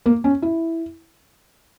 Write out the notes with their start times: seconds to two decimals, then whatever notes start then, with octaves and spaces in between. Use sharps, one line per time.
0.06 A#3
0.24 C#4
0.42 E4